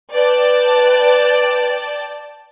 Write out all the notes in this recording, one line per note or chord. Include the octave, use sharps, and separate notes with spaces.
B4 D5 G5 A5